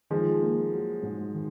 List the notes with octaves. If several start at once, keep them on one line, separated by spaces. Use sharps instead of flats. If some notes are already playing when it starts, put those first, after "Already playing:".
D#3 F3 G#3
A#3
F#3
G#2
D#3